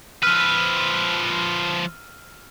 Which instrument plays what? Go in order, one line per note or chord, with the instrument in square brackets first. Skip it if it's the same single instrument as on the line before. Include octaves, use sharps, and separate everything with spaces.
[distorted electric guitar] F3 B4 [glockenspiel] E6 F6 D#7